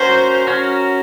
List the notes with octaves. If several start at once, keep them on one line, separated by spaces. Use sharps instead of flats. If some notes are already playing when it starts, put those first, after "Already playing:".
Already playing: C#4 F#4 A#4 C5
C#4 F#4 A#4